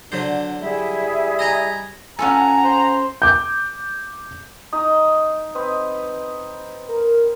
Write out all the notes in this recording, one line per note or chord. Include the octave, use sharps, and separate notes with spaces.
D3 F#3 D4 C5
G3 E4 G#4 E5
D#5 G#5 A#5
C#4 F4 A4 F#5 G#5 A#5
C5
D6 G6
D#4 D#6
C4 B4 D#5
A#4